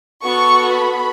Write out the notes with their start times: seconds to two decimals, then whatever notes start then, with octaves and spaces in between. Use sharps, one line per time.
0.24 B3 F#4 A4 C#6
0.73 B5